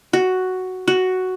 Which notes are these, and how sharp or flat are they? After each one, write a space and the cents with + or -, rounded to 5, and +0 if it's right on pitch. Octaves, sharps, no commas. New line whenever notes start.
F#4 +5
F#4 +5